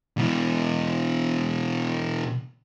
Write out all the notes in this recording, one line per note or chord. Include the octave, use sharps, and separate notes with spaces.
B2 E3